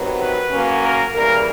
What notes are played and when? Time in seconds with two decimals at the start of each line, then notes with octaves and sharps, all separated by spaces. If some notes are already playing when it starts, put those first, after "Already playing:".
Already playing: C3 D#3 F#3 B3
0.19 B4
0.51 C#3 F#3 A#3 C#4
0.83 A#4
1.14 C#3 E3 G3 A#3 A#4